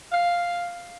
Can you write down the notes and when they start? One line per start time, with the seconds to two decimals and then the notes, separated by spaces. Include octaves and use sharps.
0.11 F5